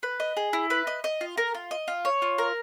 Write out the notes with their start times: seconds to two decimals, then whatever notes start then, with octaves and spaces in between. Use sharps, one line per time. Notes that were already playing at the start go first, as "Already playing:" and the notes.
0.03 B4
0.20 D#5
0.37 G#4
0.53 E4
0.70 B4
0.87 D#5
1.04 D#5
1.21 F4
1.38 A#4
1.54 F4
1.71 D#5
1.88 F4
2.05 C#5
2.22 F4
2.38 A#4